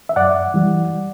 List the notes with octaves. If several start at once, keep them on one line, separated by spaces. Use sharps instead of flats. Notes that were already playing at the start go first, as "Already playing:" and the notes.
E5
F#2 D5 F#5
E3 G3